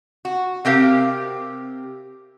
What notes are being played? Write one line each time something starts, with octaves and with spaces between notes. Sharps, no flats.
F#4
C3 C4 G4 A#4 F5